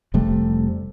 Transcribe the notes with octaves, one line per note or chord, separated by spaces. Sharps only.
F1 C3 G3 A3